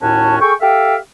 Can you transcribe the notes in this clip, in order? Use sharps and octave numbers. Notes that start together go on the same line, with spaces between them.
D#2 A2 C#4 F#4 A5
G#4 A4 G5 C#6
G4 A4 E5 F5 G5